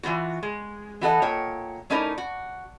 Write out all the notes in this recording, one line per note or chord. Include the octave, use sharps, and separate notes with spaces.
E3 C4 F4 F#4
G#3
E3 F#4 A4 D#5
A#2 C#5 G5
A3 C#4 D#4 E4 A#4 D5
F#4